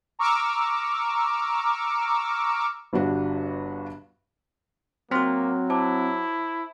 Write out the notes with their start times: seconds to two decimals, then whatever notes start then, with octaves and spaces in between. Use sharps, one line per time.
0.19 A#5 C#6 D6 E6 F6
2.93 G1 G2 D4 F#4 B4
5.11 F#3 A#3 C4 F#4 C6 F6 A#6
5.70 E4 C5 A5 D6